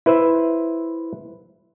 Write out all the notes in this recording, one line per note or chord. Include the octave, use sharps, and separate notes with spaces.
E4 B4 C5 E5